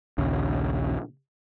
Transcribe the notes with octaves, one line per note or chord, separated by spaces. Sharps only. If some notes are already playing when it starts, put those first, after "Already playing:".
A#1 D#2 C#3